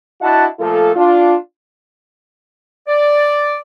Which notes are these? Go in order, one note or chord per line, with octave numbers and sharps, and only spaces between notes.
D4 E4 F#4 D#5 F#5 A5
A#2 F3 A3 F4 A4
D4 F4
D5